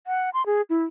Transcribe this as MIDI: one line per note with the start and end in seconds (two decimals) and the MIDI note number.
0.07 0.30 78
0.34 0.45 84
0.46 0.62 68
0.70 0.84 64